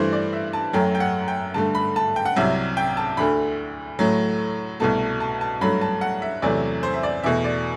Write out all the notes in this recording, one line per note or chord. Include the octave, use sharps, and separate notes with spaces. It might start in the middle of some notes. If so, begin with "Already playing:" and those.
Already playing: G2 E3 A3 C5
D5
E5
A5
F#2 F#3 A3 G5
G5
F#5
G5
G2 D3 A3 A5
B5
A5
G5
F#5
C2 C3 F#3 E5
G5
A5
D2 D3 A3 B5
A2 F#3 A3
C2 B2 A3 A5
A5
A5
G2 F#3 A3 B5
A5
F#5
E5
E2 C3 F#3 A3 D5
C5
E5
D5
E2 B2 A3 E5
D5